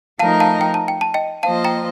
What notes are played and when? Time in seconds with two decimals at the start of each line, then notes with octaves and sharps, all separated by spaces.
0.19 F3 A3 D#4 A#4 D#5 F5 A5
0.40 F5 A5
0.61 G5
0.74 A5
0.88 G5
1.01 A5
1.14 D#5 G5
1.43 F3 A#3 F4 C5 D#5 F5 A5
1.64 G5 A#5